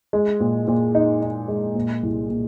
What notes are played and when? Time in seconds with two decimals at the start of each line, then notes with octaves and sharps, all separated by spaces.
0.13 G#3
0.40 A#2
0.68 A#2
0.95 D#4
1.22 D#4
1.48 G#3
1.75 A#2
2.03 C2
2.30 A#2